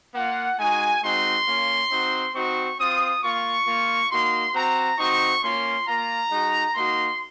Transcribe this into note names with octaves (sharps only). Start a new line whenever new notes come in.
A#3 F4 F#5
G#3 D#4 F#4 G#5
G#3 C4 D#4 F#4 C6
A#3 C#4 F4
C4 D#4 F#4
C4 D#4 F#4 C#6
C4 F4 D#6
A#3 F4 C#6
A#3 F4
A#3 D#4 F#4 C6
C4 F#4 A#5
C4 D#4 F#4 C#6
A#3 C#4 F4 C6
A#3 F4 A#5
G#3 D#4 F#4
A#3 D#4 F#4 C6